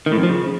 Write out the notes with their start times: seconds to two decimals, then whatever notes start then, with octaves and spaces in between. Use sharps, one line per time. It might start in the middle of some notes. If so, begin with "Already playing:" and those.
0.06 D#3
0.12 A2
0.18 F2
0.23 F3
0.29 C#3